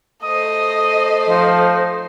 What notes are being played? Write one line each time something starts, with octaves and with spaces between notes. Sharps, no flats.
A3 C5 D#5 D#6
F3 D#4